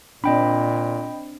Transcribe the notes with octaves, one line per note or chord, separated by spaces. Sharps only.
A#2 C4 D4 D#5 G5 B5